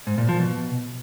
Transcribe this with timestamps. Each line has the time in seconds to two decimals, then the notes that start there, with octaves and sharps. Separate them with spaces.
0.07 G#2
0.18 A#2
0.29 F3
0.40 B2